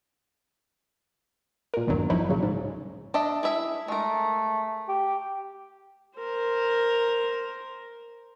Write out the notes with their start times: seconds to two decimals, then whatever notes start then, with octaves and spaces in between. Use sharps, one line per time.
1.74 A#2 A#4
1.87 G#1 E2 G2 F#3
2.10 F3 F#3 D#4 E4
2.29 C2 A#2 C#3 F#3
2.43 G#2
3.14 D4 D#5 E5
3.43 E4 G#4 E5
3.88 G#3 A3 A#4
4.89 G4
6.18 A#4 C5